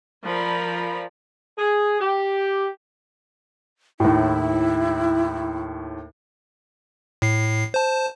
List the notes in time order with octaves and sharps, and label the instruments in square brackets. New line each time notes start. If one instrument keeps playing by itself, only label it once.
[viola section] F3 A#4 D5 B5
[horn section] G#4
G4
[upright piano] D#2 A2 [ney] E4
[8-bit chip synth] A2 C7
C5 A5